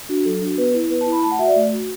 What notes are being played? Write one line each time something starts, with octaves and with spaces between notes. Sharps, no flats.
D4 F#4
F#3 A4
D4 F#4
B3 B4
E4
B3 B4
A5
E4
B5
A3 A5
F#5
F#4 E5
D5
A3
F#4